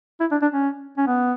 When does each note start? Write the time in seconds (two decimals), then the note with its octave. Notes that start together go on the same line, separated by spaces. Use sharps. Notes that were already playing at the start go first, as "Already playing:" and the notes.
0.20 E4
0.31 D4
0.42 D4
0.52 C#4
0.98 C#4
1.07 B3